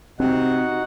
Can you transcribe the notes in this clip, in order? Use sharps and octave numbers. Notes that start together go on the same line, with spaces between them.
C3 C4 D#4 F#4 F#5